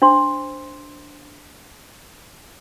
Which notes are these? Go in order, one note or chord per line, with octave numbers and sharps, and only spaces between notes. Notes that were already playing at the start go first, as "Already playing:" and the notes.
D4 C5 C6